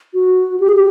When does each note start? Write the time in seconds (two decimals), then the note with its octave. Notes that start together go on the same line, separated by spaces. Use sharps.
0.14 F#4
0.60 G4
0.68 G#4
0.75 G4